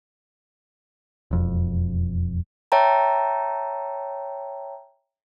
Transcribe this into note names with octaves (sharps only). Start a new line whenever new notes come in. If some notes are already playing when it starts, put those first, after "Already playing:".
E1 F2
C#5 E5 G5 A5 A#5